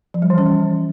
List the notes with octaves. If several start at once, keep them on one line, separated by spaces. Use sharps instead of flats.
F3
G3
E3
C#4
G3